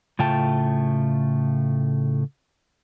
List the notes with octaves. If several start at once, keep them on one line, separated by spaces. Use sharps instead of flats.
A2 C#3 A3 F4 G5 A5